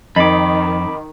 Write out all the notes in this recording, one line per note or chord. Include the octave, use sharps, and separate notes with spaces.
F2 D#3 D#5 B5 D6